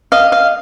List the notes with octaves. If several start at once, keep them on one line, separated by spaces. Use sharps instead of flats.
D#5 F5
F5